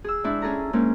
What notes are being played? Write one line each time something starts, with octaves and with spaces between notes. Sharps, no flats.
G#4 E6
G#2 D4 E4
C#4 G#4 A4 A#5
G#2 A#3 C#4 G#4